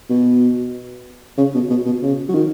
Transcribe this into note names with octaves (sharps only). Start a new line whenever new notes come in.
B2
C#3
B2
B2
B2
C#3
F#3
D#3